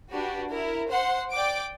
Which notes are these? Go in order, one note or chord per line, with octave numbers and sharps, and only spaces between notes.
D4 F#4 G4 B4
E4 A#4
C5 F#5 C6
D5 G5 D6 D7